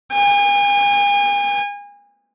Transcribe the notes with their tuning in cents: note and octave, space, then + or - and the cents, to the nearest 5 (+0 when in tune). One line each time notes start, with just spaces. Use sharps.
G#5 -40